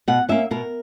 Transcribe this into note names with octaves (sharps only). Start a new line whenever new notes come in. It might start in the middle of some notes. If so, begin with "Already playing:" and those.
B2 F#5
A#3 C#4 E5
B2 A#4